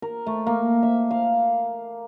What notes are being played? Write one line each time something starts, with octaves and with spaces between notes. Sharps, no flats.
A#4
A3
A#3
E5
F5